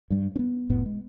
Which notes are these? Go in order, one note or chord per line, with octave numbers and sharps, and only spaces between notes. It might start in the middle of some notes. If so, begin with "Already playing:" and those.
G2 G3
B3 C#4
F1 A2 B3
G#3